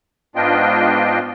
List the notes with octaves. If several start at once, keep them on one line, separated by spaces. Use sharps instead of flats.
G#2 B3 D4 F4 D#5 G5